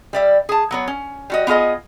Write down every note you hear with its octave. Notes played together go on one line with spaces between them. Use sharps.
G3 D5 E5
G#4 A5
F#3 B3 C#5
C#4
G3 F#4 D#5
B3 F4 G#4 D#5